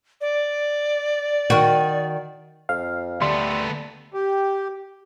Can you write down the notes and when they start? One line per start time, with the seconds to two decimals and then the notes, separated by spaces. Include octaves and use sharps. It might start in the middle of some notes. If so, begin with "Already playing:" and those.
0.21 D5
1.50 D#3 F#4
2.69 F2 F5
3.22 D2 G3 A3 B3 C6
4.14 G4